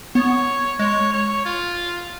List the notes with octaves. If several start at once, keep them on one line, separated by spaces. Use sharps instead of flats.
B3 C#5
G#3 C#5
C#5
F4